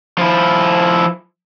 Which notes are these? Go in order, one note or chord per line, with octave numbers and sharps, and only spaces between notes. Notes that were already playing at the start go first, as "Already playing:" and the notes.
F3 E4